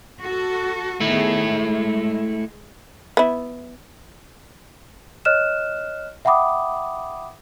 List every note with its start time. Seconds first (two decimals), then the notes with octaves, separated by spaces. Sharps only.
0.20 F#4 A4
1.00 D#3 A3 B3 E4 G#4
1.42 G#3
3.17 B3 E4
5.25 C#5 D#5 F6 F#6 E7
6.25 E5 F#5 G5 B5 D6 D#6